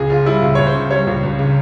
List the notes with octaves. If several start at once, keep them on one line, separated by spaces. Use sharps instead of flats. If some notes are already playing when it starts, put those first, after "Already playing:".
Already playing: C#2 G#4
C#3 F4
G3 E4
C#2
C#2 C#5
C5
C#3
G3 C#5
C#2
C#2
C#3